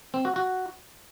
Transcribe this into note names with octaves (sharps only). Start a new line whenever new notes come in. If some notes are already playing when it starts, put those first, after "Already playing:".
C4
F#4
F#4